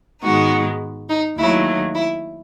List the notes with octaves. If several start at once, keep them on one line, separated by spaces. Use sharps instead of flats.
G#2 D#3 G#3 B3 D#4 F#4
D#4
D#2 D#3 F#3 A3 E4
E4